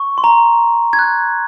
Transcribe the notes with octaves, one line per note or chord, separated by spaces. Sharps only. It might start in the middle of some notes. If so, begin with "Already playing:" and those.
Already playing: C#6
C6
A#5
G#6
F#6